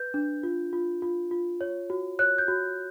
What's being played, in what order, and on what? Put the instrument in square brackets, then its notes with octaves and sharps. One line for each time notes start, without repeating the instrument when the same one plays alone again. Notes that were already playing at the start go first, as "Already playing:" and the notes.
Already playing: [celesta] B4 G6
D4
F4
F4
F4
F4
C#5
F#4
C#5 F#6
G6
F#4